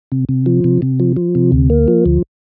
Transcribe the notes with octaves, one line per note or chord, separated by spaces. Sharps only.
C3
C3
F3
C3
C3
F3
F3
C3
D2
A#3
F3
D2